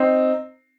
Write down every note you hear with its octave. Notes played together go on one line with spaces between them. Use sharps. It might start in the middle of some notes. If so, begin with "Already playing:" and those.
Already playing: C4 D#4